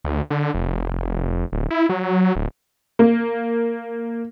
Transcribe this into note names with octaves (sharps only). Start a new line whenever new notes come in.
D2
D3
F1
D1
E4
F#3
D1
A#3